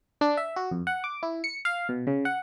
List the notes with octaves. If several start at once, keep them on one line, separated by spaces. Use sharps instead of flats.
D4
E5
F#4
F2
F#5
D6
E4
C#7
F5
B2
C#3
F#5